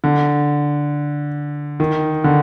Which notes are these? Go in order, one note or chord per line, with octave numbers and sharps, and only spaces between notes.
D3
D#3
D3